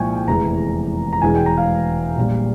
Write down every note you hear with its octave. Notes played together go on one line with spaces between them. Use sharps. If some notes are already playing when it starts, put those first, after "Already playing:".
Already playing: C2 A#2 F3 G#3 G5 G#5 C#6
G5
F1 E2 E3 G#3 A#5
A#5
E1 E2 E3 G#3 G#5
G5
A#5
F5
A#1 A#2 G3